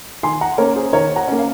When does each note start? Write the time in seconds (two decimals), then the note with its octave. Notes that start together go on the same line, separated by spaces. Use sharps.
0.23 D#3 G#5 C6
0.41 F#5 A#5
0.58 A#3 C#4 A#4 C#5
0.75 G#4 C5
0.93 D#3 A#4 C#5
1.16 F#5 A#5
1.28 A#3 C#4
1.39 F5